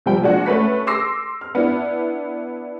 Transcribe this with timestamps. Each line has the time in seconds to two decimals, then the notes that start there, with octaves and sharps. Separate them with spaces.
0.06 C3 F3 G3 G5
0.22 A#2 F3 G#3 D4 F#4
0.46 A3 C#4 B4 B6
0.87 C6 D6 E6 A#6 C7
1.41 F6
1.55 B3 D4 E4